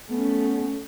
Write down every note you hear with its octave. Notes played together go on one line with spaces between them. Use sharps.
A3 B3 C#4